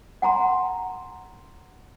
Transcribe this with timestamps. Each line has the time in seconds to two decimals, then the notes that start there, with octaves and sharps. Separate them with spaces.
0.22 F#5 G#5 A#5 C6